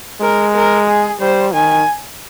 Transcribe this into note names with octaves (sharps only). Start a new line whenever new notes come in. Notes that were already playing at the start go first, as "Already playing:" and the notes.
G#3 A#4
A#4
G#4
G3 C5
D#3 G#5